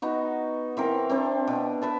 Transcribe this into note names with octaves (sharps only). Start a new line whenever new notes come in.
B3 D#4 F#4
E3 C4 A#4
C4 D4 B4
B2
B4 E5 A5